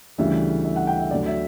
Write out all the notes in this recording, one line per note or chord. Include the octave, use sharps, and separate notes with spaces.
D2 C#3 E3 G3 E5
E5
F#5
G5
E5
D2 D3 F#3 D5
E5